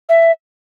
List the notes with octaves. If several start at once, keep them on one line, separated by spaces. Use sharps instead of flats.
E5